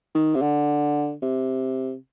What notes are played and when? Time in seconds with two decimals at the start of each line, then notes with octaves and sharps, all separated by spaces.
0.15 D#3
0.35 C3
0.42 D3
1.22 C3